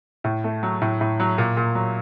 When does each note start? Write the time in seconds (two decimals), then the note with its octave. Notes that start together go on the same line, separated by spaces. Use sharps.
0.24 A2
0.44 A3
0.63 F#3
0.82 A2
1.01 A2
1.20 F#3
1.38 A#2
1.57 A#2
1.75 F#3